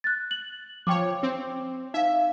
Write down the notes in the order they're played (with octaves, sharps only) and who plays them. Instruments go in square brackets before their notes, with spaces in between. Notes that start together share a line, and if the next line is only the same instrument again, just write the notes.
[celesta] F#6 A6
F#7
[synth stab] F3 C#5 [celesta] G5 D6
[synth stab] C4
[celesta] D#4 F5 [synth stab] E5